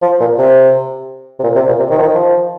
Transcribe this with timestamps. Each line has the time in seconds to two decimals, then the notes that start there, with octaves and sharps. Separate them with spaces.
0.02 F3
0.20 A#2
0.38 C3
1.39 C3
1.44 A#2
1.55 C3
1.67 A#2
1.79 C3
1.91 D#3
1.98 F3
2.02 D#3
2.14 F3